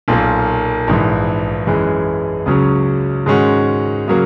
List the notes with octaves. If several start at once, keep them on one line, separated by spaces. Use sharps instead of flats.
B1 A#2 A#3
A#1 G#2 E3
F#2 E3 G#3
C#2 C#3 F#3 C#4
G#2 D#3 G#3 C#4 F#4
C#3 F#3 A#3